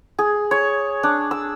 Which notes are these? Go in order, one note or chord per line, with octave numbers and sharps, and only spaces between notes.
G#4
C#5
D4
E6